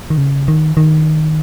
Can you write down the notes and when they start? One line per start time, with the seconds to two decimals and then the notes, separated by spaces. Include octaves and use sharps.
0.10 D#3
0.18 C#3
0.48 D#3
0.77 D#3